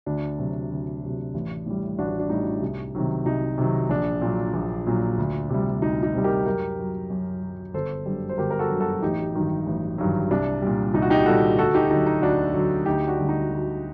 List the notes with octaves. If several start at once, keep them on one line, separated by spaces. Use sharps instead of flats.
D2 D4
C3 F#3
D2
C3 F#3
A1
A2 G3
A1 D4 F#4
D4
A2 G3 D#4
C2
C3 D#3 F#3
C2 D#4
C3 D#3 F#3
A#1 D4
A#2 F#3
A#1
A#2 F#3
D2
C3 G3
D2 D#4
D#4
C3 G3
G4 A#4
F#2 G4 A#4
F#3
F#2
F#3
G1 A4 C5
F#2 D3 G3
C5
G1 G4 A#4
A#4
F#4 A4
F#2 D3 G3
F#4 A4
A1 D#4 G4
G2 D#3 F#3
A1
G2 D#3 F#3
C2 D4
A#2 G3
C2 D#4
F#4
D#4 G4
A#2 G3 F#4 A4
D2 F#4 A4
D#4 G4
D3 F#3 D#4
D#4
D2 D4 F#4
D3 F#3
D2 D#4 G4
D4 F#4
D3 G3
D#4
D2